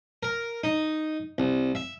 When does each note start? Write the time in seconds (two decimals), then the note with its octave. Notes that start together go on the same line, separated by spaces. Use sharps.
0.23 A#4
0.64 D#4
1.38 C2
1.75 E5